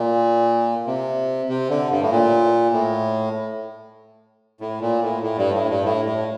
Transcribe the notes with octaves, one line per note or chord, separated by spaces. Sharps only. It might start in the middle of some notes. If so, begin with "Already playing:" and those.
Already playing: A#2
C3
C3
D3
G2
A2
A#2
A2
A2
A#2
A2
A2
G2
A2
G2
A2
A2